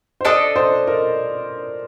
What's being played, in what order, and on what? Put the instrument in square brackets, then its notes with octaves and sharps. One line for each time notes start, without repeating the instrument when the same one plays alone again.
[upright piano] C5
[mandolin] D4 A4 D#5 [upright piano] D5
[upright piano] C5
A#4